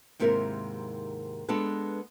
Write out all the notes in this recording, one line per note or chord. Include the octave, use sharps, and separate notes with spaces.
D#2 G#2 C3 E4 A#4
G#3 B3 D4 A4 B4